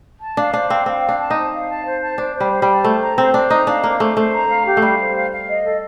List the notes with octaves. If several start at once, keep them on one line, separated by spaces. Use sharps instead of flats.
A5
D4 F5
D4 C5
C4 F5
C4 F5
C5
D4
A5
D#4
C5
F5
A5
C5
A5
D4 C5
C5
G3
C5
G3
A5
A3 C5
A#5
C4 C5
D4 C5
D#4 A#5
D4 F5
A#3 C5
A3 C5
A3 C5
A#5
F5
G4
A3
G3 F5
C5
F5
F5
D#5
A4